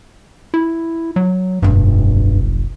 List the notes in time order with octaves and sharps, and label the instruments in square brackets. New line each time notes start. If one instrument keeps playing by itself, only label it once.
[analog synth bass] E4
F#3
[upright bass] F1 B1 [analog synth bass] G2